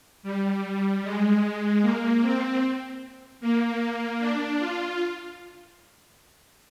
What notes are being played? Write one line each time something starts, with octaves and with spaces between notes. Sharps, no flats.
G3
G#3
A#3
C4
A#3
D4
F4